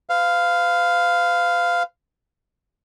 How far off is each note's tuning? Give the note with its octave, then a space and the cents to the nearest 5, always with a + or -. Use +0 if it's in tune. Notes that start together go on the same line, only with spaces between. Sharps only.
B4 +45 F5 +0